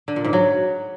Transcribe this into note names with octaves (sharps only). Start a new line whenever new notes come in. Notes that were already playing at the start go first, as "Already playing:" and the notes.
D3
A#2
G#2
F#3